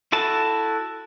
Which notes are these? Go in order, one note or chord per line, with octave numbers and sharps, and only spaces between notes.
E4 F#4 A4 A5